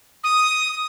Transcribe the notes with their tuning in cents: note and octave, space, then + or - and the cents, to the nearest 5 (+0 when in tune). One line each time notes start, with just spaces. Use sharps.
D#6 +5